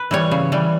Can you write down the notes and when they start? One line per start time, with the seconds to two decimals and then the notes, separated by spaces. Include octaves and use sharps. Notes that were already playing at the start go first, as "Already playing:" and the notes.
Already playing: B4
0.11 E3 G3 C#5
0.31 C#3
0.52 E3 G3